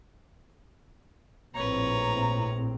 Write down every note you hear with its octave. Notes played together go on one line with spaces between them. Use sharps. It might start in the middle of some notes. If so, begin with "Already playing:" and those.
A#1 A2 C4 B4 C#5 A#5